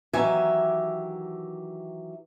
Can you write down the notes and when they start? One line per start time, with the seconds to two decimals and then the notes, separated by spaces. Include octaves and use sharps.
0.13 D#3 E3 F#3 G4 E5 G#5